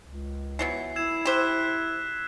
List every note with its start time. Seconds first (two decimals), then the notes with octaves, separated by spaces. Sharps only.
0.04 C#2
0.59 E3 F#3 B3 C7
0.96 E4 E6 G#6 E7
1.25 G4 C5 F#6 B6 E7